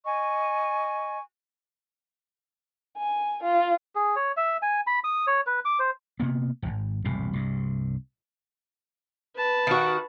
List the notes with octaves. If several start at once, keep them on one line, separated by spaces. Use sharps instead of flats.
D#5 G#5 C#6
G#5
F4
G#4
C#5
E5
G#5
B5
D#6
C#5
B4
D6
C5
C3 A#3 B3
D#1 G#1
E1 C2 F#2 A2
C2 G2
B4 A5
D#3 F#4